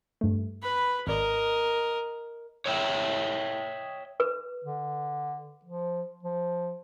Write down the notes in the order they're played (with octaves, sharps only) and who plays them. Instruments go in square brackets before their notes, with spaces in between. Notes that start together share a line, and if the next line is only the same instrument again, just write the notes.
[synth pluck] G2 A3
[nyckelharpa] B4 B5
[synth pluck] G#1 D5 A#5 [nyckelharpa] A#4 D#5
[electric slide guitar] C#5 D#5 E5 G5
[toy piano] B4
[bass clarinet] D3
F3
F3